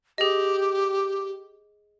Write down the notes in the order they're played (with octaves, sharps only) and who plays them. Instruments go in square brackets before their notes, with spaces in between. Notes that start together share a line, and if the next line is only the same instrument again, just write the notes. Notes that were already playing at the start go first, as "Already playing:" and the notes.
[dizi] G4 [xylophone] G#4 D#5